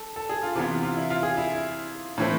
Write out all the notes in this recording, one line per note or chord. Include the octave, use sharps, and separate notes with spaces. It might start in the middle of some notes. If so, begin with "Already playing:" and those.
Already playing: A4
A4
G#4
F4
C3 E3 B3 F4
F4
E4
F4
G#4
E4
A2 E3 A3 C4